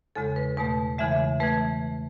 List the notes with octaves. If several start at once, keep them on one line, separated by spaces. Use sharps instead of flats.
E2 C#3 G#3 A4
B4
E2 B2 A3 B4
E2 C#3 E3 G#3 E5
E3 A3 B4